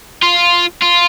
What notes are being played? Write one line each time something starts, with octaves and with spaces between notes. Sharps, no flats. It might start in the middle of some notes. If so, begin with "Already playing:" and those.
F4
F4